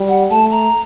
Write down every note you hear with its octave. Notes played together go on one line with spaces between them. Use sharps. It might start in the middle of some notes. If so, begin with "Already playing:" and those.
Already playing: G3
F#5
A3 A5
A#5